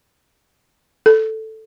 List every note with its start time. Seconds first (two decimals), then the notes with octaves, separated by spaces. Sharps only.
1.06 A4